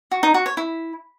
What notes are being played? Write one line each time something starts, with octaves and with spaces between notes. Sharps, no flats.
F#4
D#4
F#4
C#5
E4